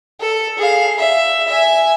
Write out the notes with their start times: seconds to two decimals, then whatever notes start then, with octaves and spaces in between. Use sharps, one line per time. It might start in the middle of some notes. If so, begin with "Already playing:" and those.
0.20 A4
0.59 G#4 F5
0.98 E5
1.47 E5 G#5